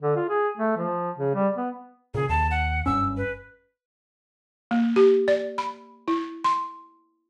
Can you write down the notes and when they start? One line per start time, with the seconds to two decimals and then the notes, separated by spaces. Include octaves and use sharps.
0.02 D3
0.16 F4
0.29 G#4
0.57 A3
0.78 F3
1.18 C#3
1.35 G3
1.56 B3
2.14 A#2 C#3 G#4
2.29 D#2 A5
2.51 F#5
2.86 F#1 G2 C#4 E6
3.17 B4
4.71 A#3
4.96 G4
5.28 D5
5.58 B5
6.08 E4
6.44 C6